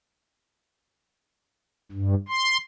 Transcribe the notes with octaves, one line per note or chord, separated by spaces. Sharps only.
G2
C6